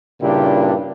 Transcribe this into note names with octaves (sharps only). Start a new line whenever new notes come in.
G2 A#2 C#3 D4 E4 G4